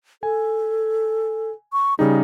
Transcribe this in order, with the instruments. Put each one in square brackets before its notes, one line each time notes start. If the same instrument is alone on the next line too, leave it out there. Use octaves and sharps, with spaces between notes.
[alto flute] A4 [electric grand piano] G#5
[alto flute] C#6
[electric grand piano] C#3 G3 D#4 [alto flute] G#4